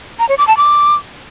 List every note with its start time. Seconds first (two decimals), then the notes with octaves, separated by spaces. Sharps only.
0.19 A#5
0.29 C#5
0.38 D6
0.48 A5
0.57 D6